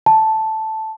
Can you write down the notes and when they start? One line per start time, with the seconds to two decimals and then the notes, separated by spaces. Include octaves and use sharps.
0.06 A5